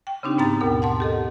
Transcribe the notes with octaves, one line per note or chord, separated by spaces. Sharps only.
G5
C#3 C4 D4 D#4 G4
G#2 B3 D#4 G5 A#5 A6
D#2 B2 A#4
F#5 A5 C6
G4 A4 D#5